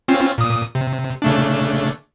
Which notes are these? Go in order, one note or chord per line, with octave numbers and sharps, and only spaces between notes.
C4 C#4 F4
A#2 D#6
C3
C#3 A3 D4